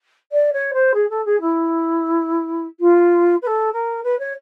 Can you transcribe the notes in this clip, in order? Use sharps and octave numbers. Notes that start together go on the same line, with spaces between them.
D5
C#5
C5
G#4
A4
G#4
E4
F4
B4
A4
A#4
B4
C#5